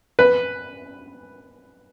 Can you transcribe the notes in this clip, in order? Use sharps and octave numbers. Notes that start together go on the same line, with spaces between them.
B4